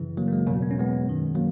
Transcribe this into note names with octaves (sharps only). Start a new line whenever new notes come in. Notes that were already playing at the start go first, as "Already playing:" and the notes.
Already playing: F#2 C#3 E3
F#3 A#3
A#3
G#3
E2 B2 F#3 A#3
B3
C#4
G#3 B3
F#2 D#3
F#3 A#3